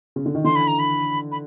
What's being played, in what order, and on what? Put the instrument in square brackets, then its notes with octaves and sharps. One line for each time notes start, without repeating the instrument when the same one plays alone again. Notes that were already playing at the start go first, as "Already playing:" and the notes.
[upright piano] C#3
D3
D#3
[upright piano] D3 E3 [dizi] C6
[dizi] B5
A#5
B5
B5